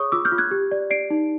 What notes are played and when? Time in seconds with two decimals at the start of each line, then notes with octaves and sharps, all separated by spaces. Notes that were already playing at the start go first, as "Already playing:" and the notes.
Already playing: G#4 C#5 C#6 D#6
0.12 F4 D6 E6
0.25 F6 G6
0.32 F4
0.38 F#6 G#6
0.51 G4
0.71 D5
0.90 D5 C7 D7
1.10 D#4